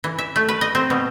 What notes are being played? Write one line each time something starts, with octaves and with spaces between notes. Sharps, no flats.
E3
E5
A3
B4
D#5
C4
B2